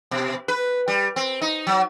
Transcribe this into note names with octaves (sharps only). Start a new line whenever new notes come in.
B2
B4
G3
C4
D#4
F#3